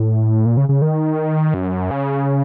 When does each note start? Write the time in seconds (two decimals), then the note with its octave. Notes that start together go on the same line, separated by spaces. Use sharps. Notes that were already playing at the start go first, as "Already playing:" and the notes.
Already playing: A2
0.46 A#2
0.57 C#3
0.69 C#3
0.82 D#3
1.54 F#2
1.91 C#3